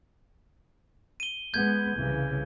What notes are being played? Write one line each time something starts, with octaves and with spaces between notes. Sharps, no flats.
D#7 G7
G#3 B3 G6 G#6
C2 C#3 E3